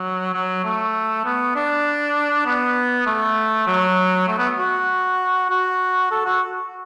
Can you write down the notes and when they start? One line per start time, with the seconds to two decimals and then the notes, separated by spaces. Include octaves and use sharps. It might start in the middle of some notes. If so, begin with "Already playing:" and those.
Already playing: F#3
0.34 F#3
0.64 A3
1.25 B3
1.55 D4
2.46 B3
3.06 A3
3.67 F#3
4.28 A3
4.38 B3
4.59 F#4
5.50 F#4
6.11 A4
6.25 F#4